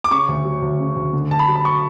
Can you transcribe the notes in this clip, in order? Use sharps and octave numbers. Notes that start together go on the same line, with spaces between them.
D6
C#3 C#6
D2
F#3
D2
C#3
D2
D3
D2 A5
B5
F#3
B5
C#6